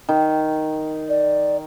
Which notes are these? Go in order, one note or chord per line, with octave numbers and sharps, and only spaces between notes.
D#3
D5